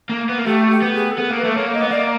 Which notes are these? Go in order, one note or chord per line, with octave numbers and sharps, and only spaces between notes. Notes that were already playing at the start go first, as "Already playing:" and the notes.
A#3
B3
A#3
A3 G4
G4
B3
G#4
A4
B3 A#4
A#3
B4
A3
A#3 C#5
D#5
B3
A#3 D5